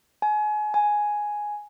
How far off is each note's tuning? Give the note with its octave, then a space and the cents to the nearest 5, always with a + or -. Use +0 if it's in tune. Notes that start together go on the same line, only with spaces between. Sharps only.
G#5 +30
G#5 +5